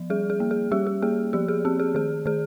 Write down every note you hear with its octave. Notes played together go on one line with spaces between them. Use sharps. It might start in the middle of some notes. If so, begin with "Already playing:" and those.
Already playing: F3
G3 G#4
G#4
A#3
G#4
G3 G4
G4
A#3 G#4
F3 G4
G#4
C4 G4
G#4
D#3 G#4
D#3 G#4